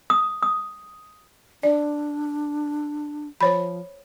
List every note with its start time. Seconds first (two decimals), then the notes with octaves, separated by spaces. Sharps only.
0.10 D#6
0.43 D#6
1.63 D4 D5
3.41 F3 C5 C#5 B5